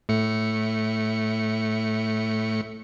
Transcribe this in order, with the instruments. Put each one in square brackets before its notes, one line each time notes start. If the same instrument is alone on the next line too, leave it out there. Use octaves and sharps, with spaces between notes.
[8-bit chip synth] A2 A3 C#7